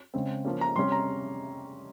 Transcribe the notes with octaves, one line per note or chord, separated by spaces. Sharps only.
C#3 G#3 C4
F3 A#3 C#4
A#5
C3 G3 C#4 C6
A#5